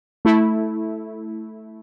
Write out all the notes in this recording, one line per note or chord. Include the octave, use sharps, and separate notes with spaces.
A3 E4